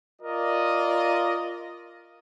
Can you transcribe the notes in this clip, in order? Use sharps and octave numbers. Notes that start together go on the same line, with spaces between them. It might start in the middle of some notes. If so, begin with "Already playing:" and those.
F4 A#4 D5 D#5